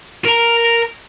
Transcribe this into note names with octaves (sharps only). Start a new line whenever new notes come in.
A#4 A#5